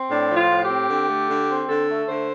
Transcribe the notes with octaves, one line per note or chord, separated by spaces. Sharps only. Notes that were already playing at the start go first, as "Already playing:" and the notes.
Already playing: C4
A2 D4
F3
F4
A2
G4
C4
D3
A3
D3
C4
D3 A4
A3
D3 C5